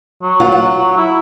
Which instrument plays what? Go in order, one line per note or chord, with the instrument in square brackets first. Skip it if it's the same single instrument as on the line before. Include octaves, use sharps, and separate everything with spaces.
[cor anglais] F#3
[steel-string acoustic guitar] F4 F#5
F#5
[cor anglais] E4